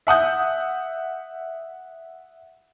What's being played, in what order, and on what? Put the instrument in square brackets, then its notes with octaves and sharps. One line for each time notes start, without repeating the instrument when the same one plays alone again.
[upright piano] E5 F#5 D#6 G6